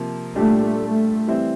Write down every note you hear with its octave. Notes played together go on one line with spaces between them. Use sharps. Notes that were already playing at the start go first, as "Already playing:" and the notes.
Already playing: C3 F3 A#3
A#2 G3 A3 D4 G4
A3
E3 G3 C4 E4